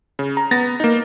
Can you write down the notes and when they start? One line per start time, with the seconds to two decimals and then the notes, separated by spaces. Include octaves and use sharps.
0.19 C#3
0.37 A#5
0.51 B3 A6 A#6
0.80 A#3 D#4